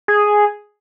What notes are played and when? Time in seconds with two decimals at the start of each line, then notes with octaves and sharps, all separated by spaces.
0.08 G#4